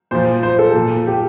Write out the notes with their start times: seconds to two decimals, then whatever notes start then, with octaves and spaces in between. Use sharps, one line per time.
0.11 A#2 F3 C5
0.43 C5
0.59 A4
0.75 A#2 F3
1.07 G4